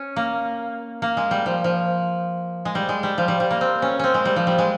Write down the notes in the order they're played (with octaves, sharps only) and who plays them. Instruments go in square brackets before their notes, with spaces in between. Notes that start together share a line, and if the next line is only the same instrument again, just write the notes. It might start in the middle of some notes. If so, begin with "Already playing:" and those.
Already playing: [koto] C#4
A#3
A#3
G#3
G3
F3
F3
G#3
G3
G#3
G3
F3
G3
G3
A#3
C4
C#4
C4 C#4
G#3
G3
F3
G3
G#3